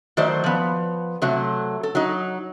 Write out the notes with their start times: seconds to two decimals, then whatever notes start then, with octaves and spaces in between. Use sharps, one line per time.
0.17 D#3 F#3 A3 C5 D5
0.44 F3 B3
1.22 C3 F#3 A3
1.83 A4
1.95 F#3 D#4